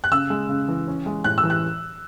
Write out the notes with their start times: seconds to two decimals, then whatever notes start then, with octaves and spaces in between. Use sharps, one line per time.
0.04 F#6
0.11 C#3 E6
0.30 G#3
0.49 C#3
0.68 E3
0.88 C#4
1.06 G#3
1.24 A2 F#6
1.38 E6
1.43 E3
1.50 F#6